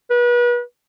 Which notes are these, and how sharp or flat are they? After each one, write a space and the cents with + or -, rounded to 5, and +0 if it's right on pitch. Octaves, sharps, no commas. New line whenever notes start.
B4 -35